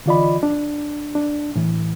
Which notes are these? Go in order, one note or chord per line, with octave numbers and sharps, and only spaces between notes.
D3 E3 F4 D5 D#5 B5
D4
D4
A2 E3